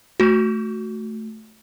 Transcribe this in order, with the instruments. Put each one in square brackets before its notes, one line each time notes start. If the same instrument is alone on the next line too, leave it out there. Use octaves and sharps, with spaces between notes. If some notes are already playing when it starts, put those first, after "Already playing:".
[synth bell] A3 F#4